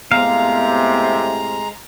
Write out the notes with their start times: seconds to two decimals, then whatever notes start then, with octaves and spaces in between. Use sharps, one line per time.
0.12 A2 C3 G#3 B3 F5 A#5